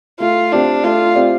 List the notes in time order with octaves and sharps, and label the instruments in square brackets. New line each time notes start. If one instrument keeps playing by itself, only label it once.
[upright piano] A3 [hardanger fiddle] F4
[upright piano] C4 G4 D5 [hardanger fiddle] D4
[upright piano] A3 [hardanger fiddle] F4
[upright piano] C4 G4 D5